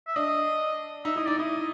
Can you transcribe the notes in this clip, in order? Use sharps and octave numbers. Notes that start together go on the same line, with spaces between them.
E5
D4 D#5
D#4 E5
E4 D#5
D#4 D5
E4 D#5